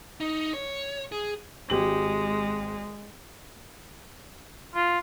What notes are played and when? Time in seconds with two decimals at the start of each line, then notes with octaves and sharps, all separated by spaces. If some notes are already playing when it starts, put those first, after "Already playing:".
0.20 D#4
0.54 C#5
1.12 G#4
1.70 G#1 G#3 G4 F#7
4.75 F4